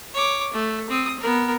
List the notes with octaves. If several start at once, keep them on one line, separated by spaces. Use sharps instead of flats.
C#5 D6
A3
C4 D#6
B3 A#4